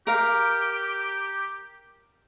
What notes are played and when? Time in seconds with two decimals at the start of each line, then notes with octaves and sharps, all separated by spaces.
0.07 G4 A#4 F5